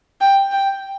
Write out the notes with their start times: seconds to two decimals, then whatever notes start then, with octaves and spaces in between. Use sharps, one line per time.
0.21 G5
0.51 G5